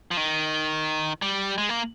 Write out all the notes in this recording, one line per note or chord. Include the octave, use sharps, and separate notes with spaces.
F3
D#3
G3
G#3
A#3